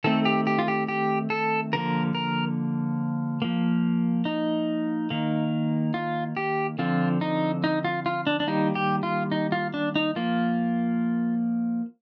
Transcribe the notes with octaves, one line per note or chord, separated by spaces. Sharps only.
D#3 A3 C4 A4
G4
G4
F4
G4
G4
A4
D3 F3 A#3 A#4
A#4
F3 A#3
D#4
D#3 A#3
F4
G4
D3 F3 C4 F4
D#4
D#4
F4
F4
D4
D4
D#3 G3 A#3 D#4
G4
F4
D#4
F4
D4
D#4
F3 A#3 F4